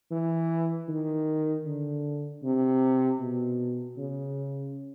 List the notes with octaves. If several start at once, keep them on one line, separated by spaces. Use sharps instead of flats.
E3
D#3
D3
C3
B2
C#3